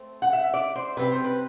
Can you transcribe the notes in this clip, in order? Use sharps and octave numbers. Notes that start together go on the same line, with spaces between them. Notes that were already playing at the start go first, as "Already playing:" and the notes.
Already playing: A3 C4
F#5
E5
D5
C5
C3 G3 C4 B4
C5
B4